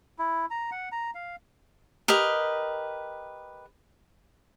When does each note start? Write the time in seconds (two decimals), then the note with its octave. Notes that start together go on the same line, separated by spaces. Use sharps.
0.19 E4
0.50 A#5
0.72 F#5
0.92 A#5
1.15 F5
2.08 G4 A#4 B4 D#5